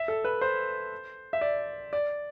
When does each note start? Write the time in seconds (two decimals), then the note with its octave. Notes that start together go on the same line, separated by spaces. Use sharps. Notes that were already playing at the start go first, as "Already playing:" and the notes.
Already playing: E5
0.08 A4
0.25 B4
0.41 C5
1.33 E5
1.41 D5
1.93 D5